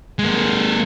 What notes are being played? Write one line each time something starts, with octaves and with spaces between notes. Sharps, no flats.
G#3 A#3